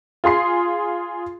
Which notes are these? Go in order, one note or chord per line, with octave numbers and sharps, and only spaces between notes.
F4 G#4 C6 C7